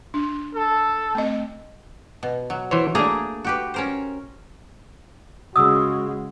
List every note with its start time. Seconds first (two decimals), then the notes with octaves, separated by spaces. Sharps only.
0.14 D4
0.55 A4
1.15 A3 C4 D#5
2.23 B2
2.50 F#3
2.71 E3 C5 C#5
2.95 A3 A#3 D4 G#4 A#5
3.44 F#4 G4 B4
3.74 C#4 A#4 C5
5.56 C#3 G#3 F#4 D#6 E6